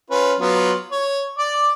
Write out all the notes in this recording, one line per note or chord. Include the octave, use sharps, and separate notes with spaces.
C#4 F4 B4
F#3 B3 F4
C#5
D5 D6